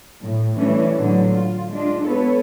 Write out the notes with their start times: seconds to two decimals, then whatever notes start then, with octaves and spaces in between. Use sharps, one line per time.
0.22 A2
0.57 E3 G3 A3 C#4 D4
0.97 A2 D3 F#3 B3
1.29 F4
1.70 G#3 D4 F4
2.06 B3 A4 B4 C#5